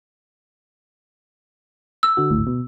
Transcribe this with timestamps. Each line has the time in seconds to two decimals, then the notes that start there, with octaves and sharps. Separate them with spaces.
2.03 E6
2.17 D3 F#4
2.31 G#1 D2 A2
2.47 B2